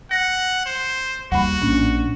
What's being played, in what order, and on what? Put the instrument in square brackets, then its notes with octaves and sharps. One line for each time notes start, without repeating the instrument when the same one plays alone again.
[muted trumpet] F#5 [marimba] A#6
[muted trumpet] C5
[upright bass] D#2 G3 [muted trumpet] F#4 [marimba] F#5 B5
[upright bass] A#1 A2 [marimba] C#4 D4